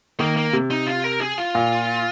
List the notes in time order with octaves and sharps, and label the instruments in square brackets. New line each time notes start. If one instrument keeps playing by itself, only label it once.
[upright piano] D#3 [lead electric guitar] A#3
[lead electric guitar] A#3
[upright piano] C3
[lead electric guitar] D#4
F4
A#4
G#4
F4
[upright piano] A#2